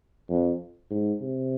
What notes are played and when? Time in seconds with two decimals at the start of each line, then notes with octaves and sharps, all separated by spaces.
0.30 F2
0.90 G#2
1.21 C3